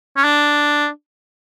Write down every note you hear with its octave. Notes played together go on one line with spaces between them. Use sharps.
C#4
D4